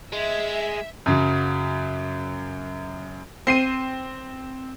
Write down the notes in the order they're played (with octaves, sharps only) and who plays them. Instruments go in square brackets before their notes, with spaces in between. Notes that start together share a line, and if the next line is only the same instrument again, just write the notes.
[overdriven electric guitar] G#3 [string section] E5
[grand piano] F#2 C#3 F#3
[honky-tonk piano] C4 C7 D#7